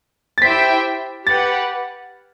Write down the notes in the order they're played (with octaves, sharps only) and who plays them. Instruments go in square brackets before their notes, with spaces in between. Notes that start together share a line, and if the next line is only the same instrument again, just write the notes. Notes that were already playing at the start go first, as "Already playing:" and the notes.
[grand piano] A6
[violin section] E4 G4 C5 E5 G5 [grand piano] B6
[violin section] G4 B4 F#5 [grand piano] A6